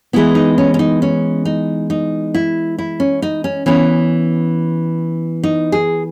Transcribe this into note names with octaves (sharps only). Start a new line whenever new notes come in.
E3 G#3 B3 E4
D#4
C#4
C#4
D#4
C#4
D#4
D#4
E4
E4
C#4
D#4
C#4
E3 B3 C#4
D#4
G#4